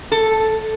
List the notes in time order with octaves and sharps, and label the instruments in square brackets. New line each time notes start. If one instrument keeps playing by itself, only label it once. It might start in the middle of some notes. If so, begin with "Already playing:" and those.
[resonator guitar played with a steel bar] A4